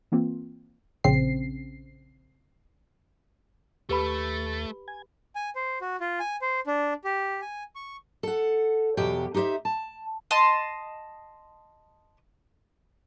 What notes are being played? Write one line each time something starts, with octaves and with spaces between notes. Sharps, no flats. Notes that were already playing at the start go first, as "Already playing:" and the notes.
E3 A#3 C4 F4
A#1 C#3 C4 C7
D#2 A3 G4 B4 B5 A6
G#5 G#6
G#5
C5
F#4
F4
G#5
C5
D4
G4
G#5
C#6
A4 F#5
E2 B2 F#3 G4 G5
D#4 G4 A#4 C5 E5
A5
D#5 A5 C6